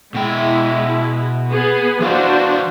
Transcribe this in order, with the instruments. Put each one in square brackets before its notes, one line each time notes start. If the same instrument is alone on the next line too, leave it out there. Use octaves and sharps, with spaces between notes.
[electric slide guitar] B2 G5 [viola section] G#3 E4
[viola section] B3 G#4 B4
[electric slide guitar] E3 B4 F5 [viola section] D4 F#4 C5